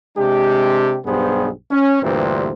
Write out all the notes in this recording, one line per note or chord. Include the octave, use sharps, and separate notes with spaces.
C3 G#3 D4 G4
B1 G2 B3 G4 G#4 C5
C#4
D2 G2 A#2 E3 G4 C5